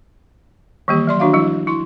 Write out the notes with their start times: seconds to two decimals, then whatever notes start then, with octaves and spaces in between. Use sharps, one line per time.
0.88 D#3 E3 G3 A#3 G4
1.07 F#3 D5 C6
1.20 D#3 D4 F#4 E5 F5
1.33 F3 G3 E4
1.67 E4 C6